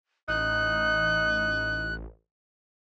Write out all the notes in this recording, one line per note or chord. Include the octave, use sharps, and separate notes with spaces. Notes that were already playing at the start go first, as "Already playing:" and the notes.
A1 D#4 F#6